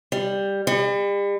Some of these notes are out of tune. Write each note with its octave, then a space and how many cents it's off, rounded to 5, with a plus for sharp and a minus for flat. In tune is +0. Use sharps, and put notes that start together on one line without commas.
G3 +10
G3 +40